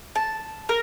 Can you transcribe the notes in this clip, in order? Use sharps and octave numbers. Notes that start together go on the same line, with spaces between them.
A5
A#4